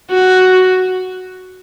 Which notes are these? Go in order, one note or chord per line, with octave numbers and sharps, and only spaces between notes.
F#4